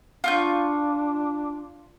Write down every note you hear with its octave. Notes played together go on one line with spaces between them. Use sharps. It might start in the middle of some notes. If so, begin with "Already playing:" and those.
D4 F4 C#6 G6